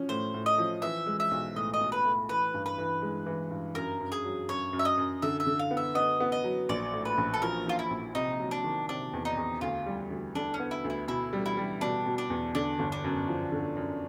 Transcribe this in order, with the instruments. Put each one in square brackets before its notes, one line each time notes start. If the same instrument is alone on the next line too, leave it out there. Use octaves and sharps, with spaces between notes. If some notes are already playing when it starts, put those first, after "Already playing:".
Already playing: [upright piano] F3 C#4
[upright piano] A2 [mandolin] C5
[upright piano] A2
[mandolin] D#5
[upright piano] F3
[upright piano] E3 [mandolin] E5
[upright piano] G#3
[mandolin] E5
[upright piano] B1
[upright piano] A2 [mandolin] D#5
[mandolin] D#5
[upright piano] B1
[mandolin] B4
[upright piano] A2
[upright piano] E3 [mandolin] B4
[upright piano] G2
[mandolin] B4
[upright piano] E3
G#3
E3
G2
[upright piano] F#2 [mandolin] A#4
[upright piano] F#2
[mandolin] G#4
[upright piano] F#3
[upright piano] F#2 [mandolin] C#5
[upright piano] F#2
[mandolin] E5
D#5
[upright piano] F#2
[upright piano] D3 [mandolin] E5
[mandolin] E5
[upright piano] D3
[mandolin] F5
[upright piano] B3
[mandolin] E5
[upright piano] B3 [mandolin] D#5
[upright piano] B3
[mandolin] D#5
[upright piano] F#3
[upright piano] A#1 [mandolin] D5
[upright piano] A2
[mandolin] B4
[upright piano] A#1
[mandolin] A4
[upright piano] F3 [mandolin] A#4
[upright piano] F3 [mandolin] F4
[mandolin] E4
[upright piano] A#1
[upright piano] C3 [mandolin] D#4
[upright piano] F#3
[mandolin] D4
[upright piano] D#3
[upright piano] C3 [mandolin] D4
[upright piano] E2
[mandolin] D#4
[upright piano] E2
[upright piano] D2 [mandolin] F4
[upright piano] G3
D2
[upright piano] D3 [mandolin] D4
[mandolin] C#4
[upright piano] B3
[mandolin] E4
[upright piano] D2
[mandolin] E4
[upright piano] B2 [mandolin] E4
[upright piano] G3
[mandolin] E4
[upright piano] G3
[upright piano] B2 [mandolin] D4
[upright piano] B2
[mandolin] D4
[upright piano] E2
[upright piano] D3 [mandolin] D4
[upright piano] G1
[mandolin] D4
[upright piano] F#2
F3
D3
F#2